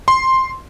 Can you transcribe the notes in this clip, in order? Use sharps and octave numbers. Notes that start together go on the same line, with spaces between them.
C6